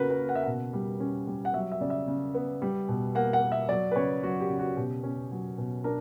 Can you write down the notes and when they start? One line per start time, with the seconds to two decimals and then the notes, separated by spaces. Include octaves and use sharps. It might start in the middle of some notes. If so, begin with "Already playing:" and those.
Already playing: C#3 A#3 F#4 A#4 B4
0.10 B4
0.19 A#3
0.29 F#5
0.35 E5
0.43 B2 F#5
0.73 G3
1.00 C#4
1.27 G3
1.45 F#5
1.54 F#3 E5
1.72 E5
1.81 C#3 D5
1.90 E5
2.07 C#3
2.35 B3
2.62 G3
2.89 B2
3.15 A#3 F#5
3.33 F#5
3.42 A#3
3.52 E5
3.69 F#3 D5
3.92 B4
3.96 C#3 C#5
4.23 F#3 F#4
4.40 G4
4.49 C#3
4.59 F#4
4.77 B2 G4
5.03 C#4
5.31 F#3
5.58 B2
5.84 D4 A#4